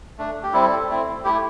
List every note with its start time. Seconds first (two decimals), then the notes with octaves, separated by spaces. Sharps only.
0.18 A3 D4
0.43 G4
0.53 G3 C4 E4 A4
0.89 A3 C4 E4
1.24 A3 E4 G4